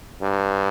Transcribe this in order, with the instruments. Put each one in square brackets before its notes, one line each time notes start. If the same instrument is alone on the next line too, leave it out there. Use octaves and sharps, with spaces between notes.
[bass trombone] G2